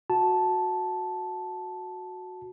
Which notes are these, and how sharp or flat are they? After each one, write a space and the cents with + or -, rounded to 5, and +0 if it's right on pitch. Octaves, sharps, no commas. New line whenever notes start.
F#4 -10 A5 -5